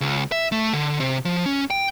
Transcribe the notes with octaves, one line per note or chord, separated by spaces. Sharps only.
C#2
E5
A3
D3
C3
F3
C#4
G5